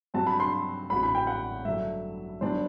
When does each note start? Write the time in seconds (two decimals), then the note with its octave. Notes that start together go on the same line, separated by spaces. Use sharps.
0.14 G2 F#3 C4 F#4 C5 A5
0.27 B5
0.40 C6
0.90 A1 A2 G3 C4 F#4 B5
1.03 B5
1.15 G5
1.27 F#5
1.65 G2 D3 F#3 A3 E5
2.41 G1 G2 F#3 B3 D4 C5